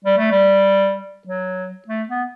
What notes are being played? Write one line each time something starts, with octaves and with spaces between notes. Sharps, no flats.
G3
A3
G3
F#3
A3
B3